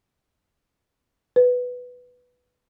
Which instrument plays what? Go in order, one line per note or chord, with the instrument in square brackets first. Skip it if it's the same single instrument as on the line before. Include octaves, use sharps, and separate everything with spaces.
[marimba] B4